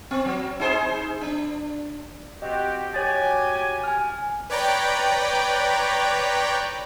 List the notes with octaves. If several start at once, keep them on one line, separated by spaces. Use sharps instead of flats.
C4
F#3
D#4 G#4 C5
D4
C4 F#4 G4 D#5
F#4 G4 C#5 G#5 A6
G#5 F6
B4 C#5 D5 G5 A#5 B5